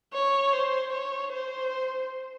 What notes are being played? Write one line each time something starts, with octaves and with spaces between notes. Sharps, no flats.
C#5
C5
C#5
C5